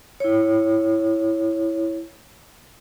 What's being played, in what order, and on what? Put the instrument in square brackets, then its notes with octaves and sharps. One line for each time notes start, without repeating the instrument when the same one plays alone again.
[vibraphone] E4 C#5